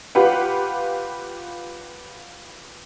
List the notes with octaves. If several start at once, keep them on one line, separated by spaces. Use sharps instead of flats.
F4 G4 B4 F#5